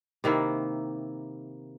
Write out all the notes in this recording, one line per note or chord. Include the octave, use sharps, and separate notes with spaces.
C3 D#3 A#3 E4